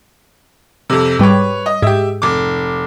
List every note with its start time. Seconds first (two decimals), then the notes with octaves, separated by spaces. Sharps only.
0.90 F2 C3
1.19 G#2 G3 B4 C#5
1.66 D#5
1.82 G#2 G4 E5
2.22 F1 D6